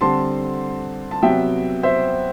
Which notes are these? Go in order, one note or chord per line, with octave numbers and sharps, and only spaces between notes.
D3 G3 C4 A5 C6
A5
C3 F#3 B3 E5 G5
C5 E5